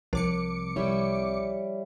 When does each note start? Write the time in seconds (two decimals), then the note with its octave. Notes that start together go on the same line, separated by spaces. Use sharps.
0.13 C2 F3 A#4 D6 C#7
0.76 G3 E4 C#5